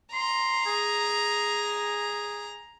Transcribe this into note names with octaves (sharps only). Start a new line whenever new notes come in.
A#5 C6
G#4